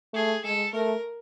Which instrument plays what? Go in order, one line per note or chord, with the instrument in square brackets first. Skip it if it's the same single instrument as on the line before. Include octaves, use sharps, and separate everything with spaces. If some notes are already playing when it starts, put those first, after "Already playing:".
[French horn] A3 [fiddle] G#4
[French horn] G#3 [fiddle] A4
[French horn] A3 [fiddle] A#4